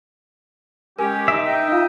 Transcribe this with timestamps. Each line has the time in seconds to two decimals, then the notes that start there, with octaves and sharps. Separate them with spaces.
0.99 G#3 C#4 G4 A#4 G#5
1.28 D#4 E5 D7
1.46 D#5 G5
1.72 F4 F5